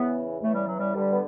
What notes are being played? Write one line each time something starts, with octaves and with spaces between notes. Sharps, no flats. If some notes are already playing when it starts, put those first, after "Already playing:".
Already playing: E2 C#3 E3 B3
E2 C#3 E3 A3
G3
F#3
G3
G2 D3 G3
B3